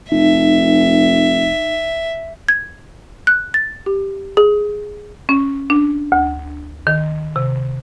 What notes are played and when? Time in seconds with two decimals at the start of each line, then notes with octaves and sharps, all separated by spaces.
0.12 F1 D#4 E5
2.49 G#6
3.27 F#6
3.54 A6
3.86 G4
4.37 G#4
5.29 C#4
5.70 D4
6.12 D2
6.87 D#3
7.36 C3